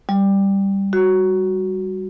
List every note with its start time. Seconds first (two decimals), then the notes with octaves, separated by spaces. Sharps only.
0.09 G3
0.93 F#4